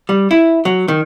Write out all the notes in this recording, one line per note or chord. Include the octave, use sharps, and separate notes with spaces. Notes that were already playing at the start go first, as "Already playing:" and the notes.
G3
E4
F#3
D#3